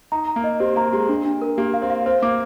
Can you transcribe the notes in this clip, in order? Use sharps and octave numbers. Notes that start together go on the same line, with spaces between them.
D#4 A#5
A#5
A#3
D#5
C4 G4
A#3 A#5
G#3 G4
D4
D4
A#4
A#3 G4
F5
C4
F5
C4 C5
A#3 D6